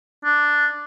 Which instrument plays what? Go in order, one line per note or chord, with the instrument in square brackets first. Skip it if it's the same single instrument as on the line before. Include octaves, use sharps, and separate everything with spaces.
[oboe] D4